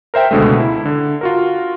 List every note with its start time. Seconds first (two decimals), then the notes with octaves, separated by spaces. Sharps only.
0.14 A#4 C5 E5 G5
0.31 C#2 B2 D3 G#3 A3
0.60 E4
0.85 D3
1.21 F4 F#4 A#4